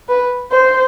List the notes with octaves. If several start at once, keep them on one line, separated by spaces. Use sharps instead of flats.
B4
C5